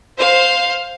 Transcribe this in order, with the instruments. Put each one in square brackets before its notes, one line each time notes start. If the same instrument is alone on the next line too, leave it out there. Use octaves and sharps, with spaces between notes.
[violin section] C5 F5